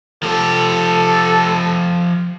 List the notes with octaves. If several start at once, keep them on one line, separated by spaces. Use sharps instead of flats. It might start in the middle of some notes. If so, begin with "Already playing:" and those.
F3 G4 A4